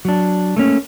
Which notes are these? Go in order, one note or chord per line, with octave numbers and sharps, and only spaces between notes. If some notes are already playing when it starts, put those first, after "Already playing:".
F#3 D4
A3 A#3 C#4